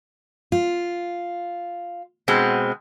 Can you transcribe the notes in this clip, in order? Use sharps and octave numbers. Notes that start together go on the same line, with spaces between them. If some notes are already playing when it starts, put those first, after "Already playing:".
F4
B2 G#3 C4